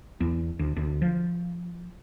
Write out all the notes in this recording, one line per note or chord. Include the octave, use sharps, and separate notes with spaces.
E2
D2
D2
F3